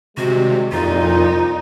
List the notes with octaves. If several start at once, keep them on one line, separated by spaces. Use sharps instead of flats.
C3 D#3 G3 G#3 F#4
C2 F2 A#2 D#4 F4